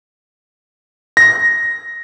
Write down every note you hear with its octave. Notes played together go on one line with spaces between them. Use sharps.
A#6